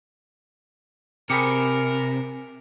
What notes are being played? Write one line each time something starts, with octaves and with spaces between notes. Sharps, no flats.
C3 G4 G#4 A#4 B5 C#7